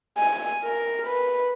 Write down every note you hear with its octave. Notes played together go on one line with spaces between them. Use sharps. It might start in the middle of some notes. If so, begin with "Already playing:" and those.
G#5
A#4
B4